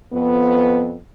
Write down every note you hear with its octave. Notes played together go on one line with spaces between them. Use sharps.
F2 B3